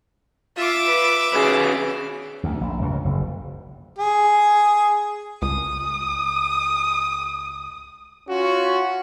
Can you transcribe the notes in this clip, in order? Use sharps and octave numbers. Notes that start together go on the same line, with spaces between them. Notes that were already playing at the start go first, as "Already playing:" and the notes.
F4 E5 D6
B4
C#4 F#4 G#4 B4
D2
A#1
C#2
F#1
G#4
C#2 D#6
C#4 F4 F#4